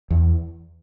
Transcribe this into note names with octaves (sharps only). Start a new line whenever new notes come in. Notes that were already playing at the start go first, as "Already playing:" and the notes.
E2